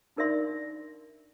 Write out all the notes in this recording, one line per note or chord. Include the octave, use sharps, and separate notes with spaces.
D4 D#4 A#4 D5 E5 C6